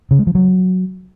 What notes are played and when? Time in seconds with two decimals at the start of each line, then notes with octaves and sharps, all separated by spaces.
0.11 C#3
0.19 G#3
0.27 F3
0.35 F#3